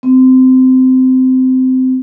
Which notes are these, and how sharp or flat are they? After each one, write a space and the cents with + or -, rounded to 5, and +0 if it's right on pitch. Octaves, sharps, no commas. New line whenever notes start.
C4 -20